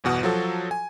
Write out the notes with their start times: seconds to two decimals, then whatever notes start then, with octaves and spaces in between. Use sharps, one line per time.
0.04 G1 E2 B2 F#5 D#6
0.23 F3 F#3 F#4 A4
0.71 G#5